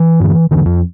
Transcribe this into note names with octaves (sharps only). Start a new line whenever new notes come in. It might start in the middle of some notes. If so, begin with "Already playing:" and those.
Already playing: E3
G2 D3
E2 D3 E3
F2 F3